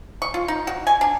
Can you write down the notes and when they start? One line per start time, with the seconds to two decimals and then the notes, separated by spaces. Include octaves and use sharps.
0.22 C#6
0.34 F4
0.48 D#4
0.67 F#4
0.87 G#5
1.01 D4